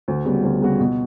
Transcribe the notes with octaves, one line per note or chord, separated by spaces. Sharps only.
D2
C#3 G3 B3 F#4
D2
C#3 G3 B3 F#4
B2